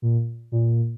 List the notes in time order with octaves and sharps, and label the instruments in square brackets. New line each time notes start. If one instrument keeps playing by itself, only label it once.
[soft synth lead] A#2
A#2